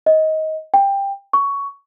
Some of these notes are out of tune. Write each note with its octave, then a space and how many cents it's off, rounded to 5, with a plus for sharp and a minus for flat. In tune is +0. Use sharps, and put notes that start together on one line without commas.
D#5 +20
G5 +15
C#6 +15